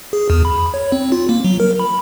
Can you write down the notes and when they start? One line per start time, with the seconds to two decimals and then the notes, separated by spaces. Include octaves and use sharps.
0.13 G#4
0.30 E2
0.45 B5
0.74 C#5
0.92 C4
1.12 F4
1.29 A#3
1.44 F#3
1.60 A#4
1.79 B5